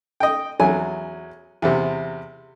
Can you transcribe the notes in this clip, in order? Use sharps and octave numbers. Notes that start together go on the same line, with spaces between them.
D#5 G5
E2 F#3 G#5
E2 C3